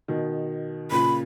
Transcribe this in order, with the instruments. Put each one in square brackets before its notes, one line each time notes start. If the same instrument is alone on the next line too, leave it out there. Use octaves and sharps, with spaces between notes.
[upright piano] B2 D#3
[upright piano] A#2 C#3 [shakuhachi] B5